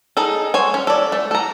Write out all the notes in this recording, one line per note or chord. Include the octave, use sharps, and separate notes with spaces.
D#4 G#4 A4
C5 C#5 G#5
C#4
A4 D5
A3
A4 A#5